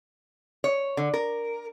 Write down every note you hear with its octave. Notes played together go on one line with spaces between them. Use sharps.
C#5
D3
A#4